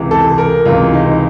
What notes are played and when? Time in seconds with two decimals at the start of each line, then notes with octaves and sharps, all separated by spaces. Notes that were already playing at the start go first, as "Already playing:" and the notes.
Already playing: C#2 C3 E3
0.11 A4
0.38 A#4
0.65 C#2 C3 E3 F4
0.93 D#4